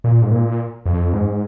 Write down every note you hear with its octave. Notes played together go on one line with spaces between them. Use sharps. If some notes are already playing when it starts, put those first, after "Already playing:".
A#2
G#2
A#2
F2
G#2